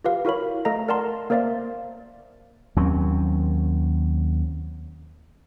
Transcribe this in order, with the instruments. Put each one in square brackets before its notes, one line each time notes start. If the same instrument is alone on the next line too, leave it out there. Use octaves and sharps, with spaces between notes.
[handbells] F4 G4 B4 F5
E4 F#4 A#4 C#5 B5
A3 A4 D#5 F5 A#5 A#6
A#4 D5 F#5 A5 A#5 C6
A#3 A#4 C5 D5 E5 F5
[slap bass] D#2 F#3 C4 C#4